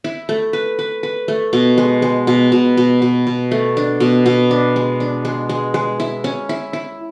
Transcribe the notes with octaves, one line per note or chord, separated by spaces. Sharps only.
E4
A3
B4
B4
B4
A3
B2
G#3
G#3
B2
B2
B2
B2
B2
A3
D4
B2
B2
D4
G#3
D4
G#3
G#3
G#3
E4
C#4
E4
E4